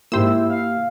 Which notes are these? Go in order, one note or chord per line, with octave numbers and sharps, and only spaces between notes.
G#2 A#3 E4 G4 C5 E6
F5